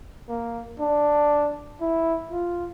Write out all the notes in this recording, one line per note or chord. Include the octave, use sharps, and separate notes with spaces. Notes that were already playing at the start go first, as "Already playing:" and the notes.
A#3
D4
E4
F4